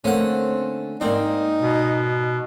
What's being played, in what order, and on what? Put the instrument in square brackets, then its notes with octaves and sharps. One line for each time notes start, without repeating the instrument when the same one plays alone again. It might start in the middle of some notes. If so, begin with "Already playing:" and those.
[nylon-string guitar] D3 A3 A#3 [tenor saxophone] C4 [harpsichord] C#4 F#5
[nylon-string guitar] G#2 A#3 D5 [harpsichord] C4 [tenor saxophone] D#4
[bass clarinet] B2